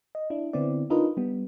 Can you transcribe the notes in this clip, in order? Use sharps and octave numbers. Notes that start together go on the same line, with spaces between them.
D#5
D4 E4
D3 B3 C4 E4 D5
D4 D#4 F4 A#4 B4 D#5
G3 B3